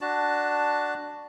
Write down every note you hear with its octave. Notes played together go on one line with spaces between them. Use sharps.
D4 F#4 A5